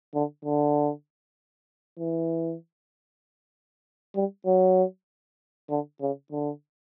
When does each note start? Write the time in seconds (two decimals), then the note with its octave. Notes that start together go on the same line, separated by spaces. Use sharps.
0.14 D3
0.45 D3
1.99 E3
4.15 G3
4.46 F#3
5.70 D3
6.01 C#3
6.32 D3